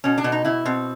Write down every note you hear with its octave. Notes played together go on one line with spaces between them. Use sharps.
B2 C#4
D4
B2
D#4
B2 E4
B2 C4